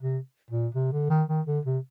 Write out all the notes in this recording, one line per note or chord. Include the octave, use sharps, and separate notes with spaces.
C3
A#2
C3
D3
D#3
D#3
D3
C3